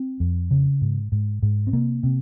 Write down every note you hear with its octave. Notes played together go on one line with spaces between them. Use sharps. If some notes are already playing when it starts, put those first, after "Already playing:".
Already playing: C4
F2
C#3
G#2
G#2
G#2
C4
C3 A#3
C3